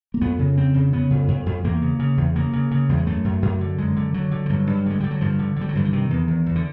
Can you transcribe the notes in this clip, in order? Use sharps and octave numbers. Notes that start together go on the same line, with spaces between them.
A#3
F2 B3
C#3
F2 C4
C#3
C#3 B3
F2
F2
F2
E2 A#3
C#3
C#3
E2
C#3 A#3
C#3
C#3
E2 G3
G#3
F#2 A3
F#2
F#2
D3
F#2 G#3
D3
D3 F#3
D3
F3
G2 F#3
G2
D3 G#3
D3 G3
F#3
G2 F3
D3
D3 G3
F#3
G2 F3
E3
C3 D#3
E2
E2
E2
D3